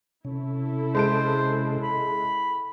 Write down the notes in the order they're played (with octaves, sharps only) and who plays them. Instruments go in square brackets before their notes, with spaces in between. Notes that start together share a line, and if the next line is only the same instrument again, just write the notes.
[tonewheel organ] C3 C#4 [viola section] E4 A4
[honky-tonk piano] G#3 A5 D7 [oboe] C5
[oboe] B5